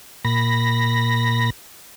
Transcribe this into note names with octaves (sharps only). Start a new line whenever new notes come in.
A#2 B5 A#6